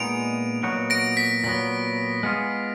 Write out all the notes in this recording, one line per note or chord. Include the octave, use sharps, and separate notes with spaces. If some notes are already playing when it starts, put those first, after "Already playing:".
Already playing: A#2 G#3 B3 D#4 D7 F7
A#2 F#3 B3 D#4 F#4
A#6 D7
B6
A#2 F#3 B3 A#6
G#3 B3 F4 G#4